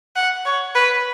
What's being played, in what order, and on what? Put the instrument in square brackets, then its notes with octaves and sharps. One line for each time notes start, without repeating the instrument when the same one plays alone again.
[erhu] F#5
C#5
B4